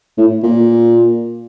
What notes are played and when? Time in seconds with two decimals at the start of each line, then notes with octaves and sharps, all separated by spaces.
0.18 A2
0.43 A#2